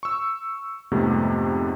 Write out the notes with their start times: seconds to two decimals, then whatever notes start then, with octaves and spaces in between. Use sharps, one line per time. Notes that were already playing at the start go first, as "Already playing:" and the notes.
0.03 C#6 E6
0.92 F2 G#2 C3 G3 A3 B3